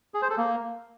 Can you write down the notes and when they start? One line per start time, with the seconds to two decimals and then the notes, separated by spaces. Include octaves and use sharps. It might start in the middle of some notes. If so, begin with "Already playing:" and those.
0.14 G#4
0.22 C5
0.30 A4
0.38 A#3